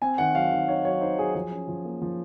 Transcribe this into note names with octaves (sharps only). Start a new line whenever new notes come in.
C4 G#5
D#3 F#5
F#3 F5
D#3
D#4 C#5
F#3 C#5
D#4 C5
F#3 G#4
F3 G#4
C#4
F3
A#3
F3